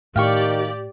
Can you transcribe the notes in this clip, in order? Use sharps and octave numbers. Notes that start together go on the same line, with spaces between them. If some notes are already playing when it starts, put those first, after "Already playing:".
A2 D#3 G4 D5 F5 G5 C#6